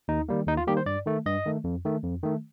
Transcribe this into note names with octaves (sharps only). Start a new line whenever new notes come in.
D#2 D#4
D#3 G3 A#3
D#2 D#4
F4
D#3 G3 A#3 G4
C5
G2 D5
D#3 A3
G2 D#5
D#3 A3
F2
D#3 A3
F2
D#3 A3